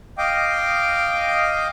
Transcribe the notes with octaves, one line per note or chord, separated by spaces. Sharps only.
D#5 F5 G5 D6